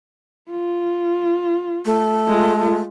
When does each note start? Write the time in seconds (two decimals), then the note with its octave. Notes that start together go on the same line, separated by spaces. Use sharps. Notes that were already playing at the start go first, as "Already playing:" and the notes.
0.50 F4
1.85 A3
2.28 G#3 F4